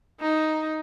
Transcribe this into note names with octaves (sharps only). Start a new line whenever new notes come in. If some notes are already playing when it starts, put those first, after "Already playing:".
D#4